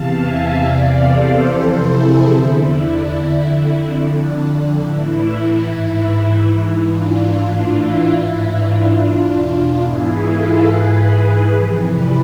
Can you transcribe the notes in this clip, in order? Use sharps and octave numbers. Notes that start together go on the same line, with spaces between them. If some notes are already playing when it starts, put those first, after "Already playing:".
Already playing: E2 C3 E3 F5 A5
E5 G#5
E2 C3 E3 D5 F5
A4 C5
F2 C3 E3
E4 G#4
E2 D3 E4
D4
F2 D3 E4
F2 D3 D4
D4
A2 E3 E4
E4
G#2 E3 E4
G#2 E3
D4 F4
A2 E3 D4 F4
E4
G#2 E3 E4
D4 F4
E2 B2
G#2 E3 E4 G#4
F4 A4
G#2 E3 G#4 B4
F2 C3 E3
B4 D5